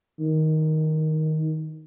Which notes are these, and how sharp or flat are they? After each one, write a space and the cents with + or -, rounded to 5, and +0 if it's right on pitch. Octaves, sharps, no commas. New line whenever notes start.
D#3 +10